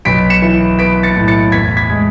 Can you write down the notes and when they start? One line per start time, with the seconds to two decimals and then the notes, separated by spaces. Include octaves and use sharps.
0.05 B1 B6 D7
0.30 C#7 E7
0.42 E3
0.79 B3 B6 D7
1.03 A6 C#7
1.16 A2
1.28 A6 C#7
1.52 E2 G#6 B6
1.77 G#6 B6
1.90 G#3